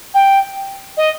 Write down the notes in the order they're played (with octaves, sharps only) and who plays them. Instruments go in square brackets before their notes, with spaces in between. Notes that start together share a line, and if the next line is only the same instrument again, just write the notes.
[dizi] G5
D#5